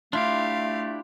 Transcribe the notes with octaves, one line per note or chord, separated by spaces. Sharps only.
A3 D4 E4 F4 G4 F5